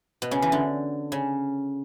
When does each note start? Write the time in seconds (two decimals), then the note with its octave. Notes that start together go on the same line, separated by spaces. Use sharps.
0.22 B2
0.31 C#3
0.42 E3
0.52 D3
1.12 C#3